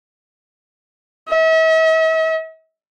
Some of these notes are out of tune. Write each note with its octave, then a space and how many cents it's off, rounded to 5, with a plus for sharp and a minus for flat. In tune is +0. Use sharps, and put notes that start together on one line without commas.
E5 -45